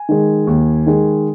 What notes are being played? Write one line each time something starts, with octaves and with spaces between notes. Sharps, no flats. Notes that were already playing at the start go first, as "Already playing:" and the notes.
Already playing: G#5
D#3 G#3
D#2
D#3 G#3